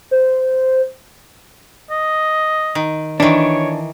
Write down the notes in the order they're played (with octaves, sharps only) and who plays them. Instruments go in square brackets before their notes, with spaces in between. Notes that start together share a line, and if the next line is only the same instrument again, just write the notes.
[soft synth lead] C5
[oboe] D#5
[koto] D#3
[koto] D#3 E3 [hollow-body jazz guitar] D4 [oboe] C#5